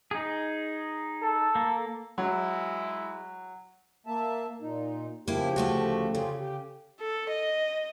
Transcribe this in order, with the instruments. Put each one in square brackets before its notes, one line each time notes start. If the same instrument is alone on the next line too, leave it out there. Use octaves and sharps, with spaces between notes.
[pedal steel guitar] D#4 G#4
[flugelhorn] A4
[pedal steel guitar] A#3
[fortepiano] F#3 [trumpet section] G#3 E4
[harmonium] A#3 E5 A5
A#2 D#4
[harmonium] C#3 F3 G4 [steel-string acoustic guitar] A#3 E4
[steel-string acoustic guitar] D2 A3 F#4
[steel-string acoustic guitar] C#3 [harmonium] F4 G4 G#4
[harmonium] G4
[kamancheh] A4
D#5